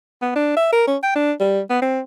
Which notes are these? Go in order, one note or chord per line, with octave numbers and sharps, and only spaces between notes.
B3
D4
E5
A#4
C#4
G5
D4
G3
B3
C4